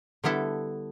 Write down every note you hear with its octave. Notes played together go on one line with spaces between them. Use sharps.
D3 G3 B3 E4 A4